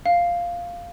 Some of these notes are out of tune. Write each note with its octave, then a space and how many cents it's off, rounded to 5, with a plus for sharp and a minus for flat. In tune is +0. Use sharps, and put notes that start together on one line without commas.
F5 +0